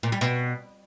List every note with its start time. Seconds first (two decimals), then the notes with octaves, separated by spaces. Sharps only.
0.03 A#2
0.12 G3
0.21 B2